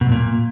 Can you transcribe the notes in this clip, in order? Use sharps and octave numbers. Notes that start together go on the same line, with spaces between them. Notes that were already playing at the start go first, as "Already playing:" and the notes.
B2
F#2
A#2